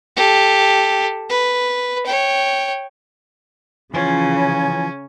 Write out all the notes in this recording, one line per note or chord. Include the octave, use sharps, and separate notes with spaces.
G4 A4
B4
C#5 G5
C#3 E3 F3 C#4 F4 G#5